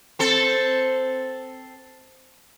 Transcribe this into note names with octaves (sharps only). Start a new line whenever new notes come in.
C4 A4